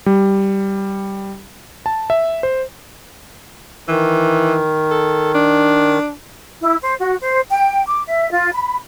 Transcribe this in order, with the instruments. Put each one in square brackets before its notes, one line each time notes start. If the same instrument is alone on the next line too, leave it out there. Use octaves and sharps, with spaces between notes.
[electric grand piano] G3
A5
E5
C5
[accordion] D#3 [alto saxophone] E3
[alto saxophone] A4
D4
[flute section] E4
C5
F#4
C5
G5
D6
E5
F4
B5